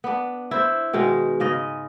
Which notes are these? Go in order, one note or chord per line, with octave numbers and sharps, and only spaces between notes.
B3 D4
E4 C5
B2 D#3 G#3
G#2 C#3 D#5